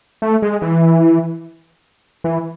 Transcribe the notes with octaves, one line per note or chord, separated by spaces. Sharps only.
A3
G#3
E3
E3